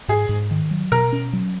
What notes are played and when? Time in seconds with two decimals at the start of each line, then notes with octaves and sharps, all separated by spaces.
0.08 G#2 G#4
0.29 G#2
0.51 D#3
0.71 F#3
0.92 B2 A#4
1.12 C#4
1.33 F#3